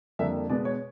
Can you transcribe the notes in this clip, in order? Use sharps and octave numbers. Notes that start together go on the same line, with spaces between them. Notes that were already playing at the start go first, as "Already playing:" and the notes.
F2 D3 G3 A#3 E5
B2 G#3 B3 D5
C#5